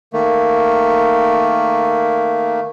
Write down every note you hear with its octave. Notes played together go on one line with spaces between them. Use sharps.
D#3 A3 A#3